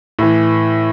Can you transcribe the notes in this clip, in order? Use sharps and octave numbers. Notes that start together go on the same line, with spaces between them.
A2 E3